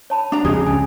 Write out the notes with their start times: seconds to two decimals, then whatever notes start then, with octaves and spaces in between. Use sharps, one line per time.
0.10 C#5 A5 B5
0.32 D4 A#5
0.45 F2 C#3 G#3 G#4
0.66 C#2 C#4 G#5